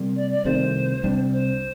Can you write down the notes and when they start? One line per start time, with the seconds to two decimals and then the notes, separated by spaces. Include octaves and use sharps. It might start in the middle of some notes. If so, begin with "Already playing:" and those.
Already playing: C3 G3 A#3
0.16 D5
0.31 D5
0.45 C2 C3 D#3 A3 C5
1.03 C2 C3 G3 D4
1.33 C5